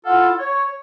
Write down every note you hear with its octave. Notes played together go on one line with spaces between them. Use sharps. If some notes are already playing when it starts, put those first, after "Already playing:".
E4 F4 A4 F5 F#5
C#5